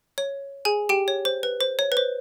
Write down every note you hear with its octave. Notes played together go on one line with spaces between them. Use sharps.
C#5
G#4 G#5
G4 G5
C#5
C5
B4
C5
C#5
B4
C5